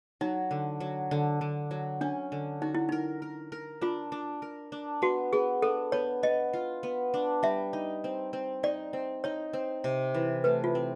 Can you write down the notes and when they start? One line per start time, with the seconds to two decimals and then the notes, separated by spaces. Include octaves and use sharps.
0.21 F#3 D#4
0.51 D3
0.80 F#3
1.11 D3
1.41 D3
1.71 F#3
2.01 C#4 D4
2.32 D3
2.62 D#4 F#4
2.75 E4
2.89 D#4 A#4
3.22 A#4
3.52 A#4
3.81 D4 F4
4.12 D4
4.42 A#4
4.72 D4
5.02 B3 F#4
5.33 B3 G#4
5.62 D4 A4
5.92 B3 C#5
6.23 B3 D#5
6.53 F4
6.83 B3
7.14 D4
7.43 G3 E5
7.73 D#4
8.04 C4
8.33 C4
8.63 D#4 D5
8.93 C4
9.24 D#4 C#5
9.53 C4
9.84 C3
10.14 E3
10.44 A3 B4
10.64 F4
10.75 C4